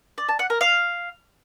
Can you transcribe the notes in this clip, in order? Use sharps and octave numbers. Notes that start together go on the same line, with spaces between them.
D5
A5
F#5
A#4
F5